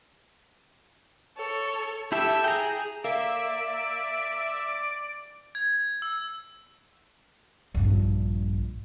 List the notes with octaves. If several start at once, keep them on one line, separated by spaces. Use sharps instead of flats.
A4 C#5
E4 G4 A4 E5
G#4 G5 A#5
A#3 D5 E5
G#6
E6
A#1 G2